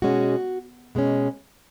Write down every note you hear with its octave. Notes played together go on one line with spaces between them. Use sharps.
B2 G#3 C#4 F#4
B2 G#3 C#4